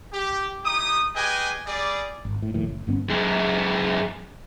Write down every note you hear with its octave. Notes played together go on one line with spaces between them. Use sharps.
G4
D#4 E4 G4 D#6
G4 G#4 B4 D#5 G5 G#5
G3 G#4 D5
G#1
A2
A#1 D#2 A2
F#1
G1 G2 B3 C#4
F#2 G#3